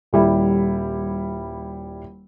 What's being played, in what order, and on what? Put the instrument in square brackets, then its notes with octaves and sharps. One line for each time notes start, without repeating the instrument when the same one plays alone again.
[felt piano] D#1 G3 E4